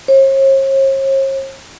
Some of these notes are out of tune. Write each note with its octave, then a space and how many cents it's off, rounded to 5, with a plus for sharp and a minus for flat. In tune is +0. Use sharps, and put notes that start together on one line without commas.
C#5 -45